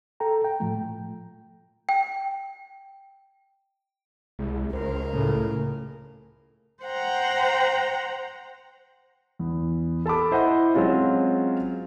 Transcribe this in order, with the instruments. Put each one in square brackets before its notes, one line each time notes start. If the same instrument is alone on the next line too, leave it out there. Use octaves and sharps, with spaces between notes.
[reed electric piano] A4 G5 A#5
G5
A2 F3 A3
[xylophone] G5
[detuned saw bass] C2 [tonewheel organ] G#3
[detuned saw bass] C#2 [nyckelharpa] A#4 [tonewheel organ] C5
[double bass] A2 C#3 [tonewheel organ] A3
[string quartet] C5 F#5 G5 A#5
[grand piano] E2
A4 A5 B5 D6
E4 C5 D#5 F#5
F#3 G#3 C4 C#4 F4